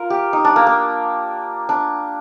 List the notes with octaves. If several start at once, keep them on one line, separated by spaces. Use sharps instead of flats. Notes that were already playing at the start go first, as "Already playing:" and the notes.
Already playing: F4 A#4
G4
D#4
D4
A#3
A#3
D4